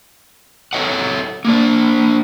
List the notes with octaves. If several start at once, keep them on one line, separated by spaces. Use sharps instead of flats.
A4 C#5 D#5 F#5
A#3 D4